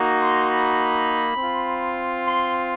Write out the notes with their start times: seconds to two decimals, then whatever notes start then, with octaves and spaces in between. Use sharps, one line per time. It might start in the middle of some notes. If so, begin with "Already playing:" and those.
Already playing: A#3 D#4 F#4
0.20 C6
0.49 B5
1.37 C4
1.43 F4
2.26 C6